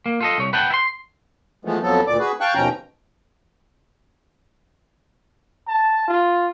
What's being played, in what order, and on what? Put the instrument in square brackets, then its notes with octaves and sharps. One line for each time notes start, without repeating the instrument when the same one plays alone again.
[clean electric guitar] A#3
F4 A4 D#5
C2 C#5
B4 F#5 G5 A5
E4 C6
[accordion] E3 F3 G#3 A3 B3
F2 F3 F#3 B3 A4
D2 A#2 D5 D6
F#4 G#4 B4
F5 G5 A5 C#6 F#6
D#2 B2 F3 C#4 G5 A#5
[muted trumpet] A5
F4